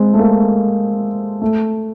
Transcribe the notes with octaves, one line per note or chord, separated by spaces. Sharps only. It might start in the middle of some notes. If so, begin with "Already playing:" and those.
Already playing: G#3 C4
A3
A#3
A3